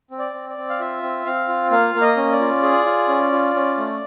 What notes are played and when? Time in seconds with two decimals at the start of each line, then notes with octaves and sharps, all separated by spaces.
0.11 C4
0.19 D5
0.34 C4
0.50 D5
0.57 C4
0.70 F5
0.80 F4 E5
1.03 C4
1.26 C4 F5
1.48 F4
1.71 A#3 F5
1.94 A#3
2.01 D#5
2.17 C#4
2.32 D5
2.40 F4
2.63 G#4
2.85 F4
3.08 C#4
3.32 F4
3.55 C#4
3.77 A3